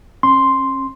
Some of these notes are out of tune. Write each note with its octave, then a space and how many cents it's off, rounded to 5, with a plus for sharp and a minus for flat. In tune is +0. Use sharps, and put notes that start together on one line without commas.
C#4 -35 C6 +0